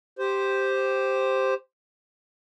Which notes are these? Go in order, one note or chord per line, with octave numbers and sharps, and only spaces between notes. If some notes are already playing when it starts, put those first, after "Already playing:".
G4 C5